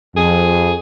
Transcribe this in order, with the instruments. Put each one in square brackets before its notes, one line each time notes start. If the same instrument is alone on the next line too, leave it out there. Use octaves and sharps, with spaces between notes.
[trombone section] F2 [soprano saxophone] G#4